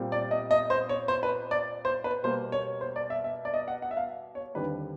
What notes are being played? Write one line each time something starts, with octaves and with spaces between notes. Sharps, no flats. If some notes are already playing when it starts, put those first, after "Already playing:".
Already playing: A#2 G3 C4
D5
D#5
D#5
C5
C#5
C5
B4
D5
C5
B4
B2 G3 A#3 C5
C#5
C5
D5
E5
E5
D5
D#5
F#5
F#5
E5
F5
C#5
D#2 D3 G3 C4 B4